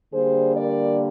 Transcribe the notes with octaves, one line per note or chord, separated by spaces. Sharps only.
D3 G3 A#3 G#4 C5
A#4 D5